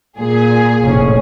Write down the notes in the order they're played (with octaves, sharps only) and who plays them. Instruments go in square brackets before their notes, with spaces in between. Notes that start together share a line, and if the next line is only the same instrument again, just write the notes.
[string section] A#2 G#4
[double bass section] F1 A2 C#4